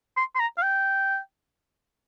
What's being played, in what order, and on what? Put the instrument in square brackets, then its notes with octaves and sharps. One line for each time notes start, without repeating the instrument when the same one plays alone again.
[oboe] C6
C6
A#5
F5
G5